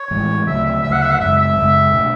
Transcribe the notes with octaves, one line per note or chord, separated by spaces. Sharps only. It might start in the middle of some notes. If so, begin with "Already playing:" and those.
Already playing: C#5
A2 E3 G#3
D2 C#3 F#3 A3 E5
E5
D2 C#3 F#3 A3 E5
F#5
E5
F#5
F#2 C#3 G#3 E5
E5
F#2 C#3 G#3
B2 A3 D4